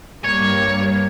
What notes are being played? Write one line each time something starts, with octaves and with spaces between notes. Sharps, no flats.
G2 A#3 C#5